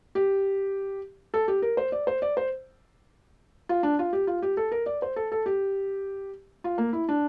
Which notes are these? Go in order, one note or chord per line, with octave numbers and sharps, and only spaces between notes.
G4
A4
G4
A#4
C5
D5
C5
D5
C5
F4
D4
F4
G4
F4
G4
A4
A#4
D5
C5
A4
A4
G4
F4
A#3
E4
D4